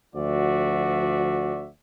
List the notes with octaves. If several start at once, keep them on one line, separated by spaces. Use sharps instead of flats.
D2 F3 F#4 D5 E5